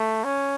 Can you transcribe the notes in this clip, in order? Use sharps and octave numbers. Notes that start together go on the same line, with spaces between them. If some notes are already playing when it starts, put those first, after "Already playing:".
Already playing: A3
C#4